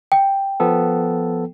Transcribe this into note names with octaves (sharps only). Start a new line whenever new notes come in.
G5
F3 B3 A4